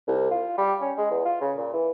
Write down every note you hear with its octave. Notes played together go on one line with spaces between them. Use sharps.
C2
F4
G3
C#4
G#3
E2
F4
C#3
A#2
E3